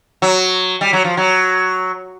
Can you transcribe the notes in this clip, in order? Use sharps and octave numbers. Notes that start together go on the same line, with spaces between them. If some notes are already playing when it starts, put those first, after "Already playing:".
F#3
G3
F#3
F3
F#3